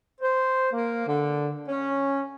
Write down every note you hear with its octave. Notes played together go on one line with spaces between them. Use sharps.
C5
A#3
D3
C#4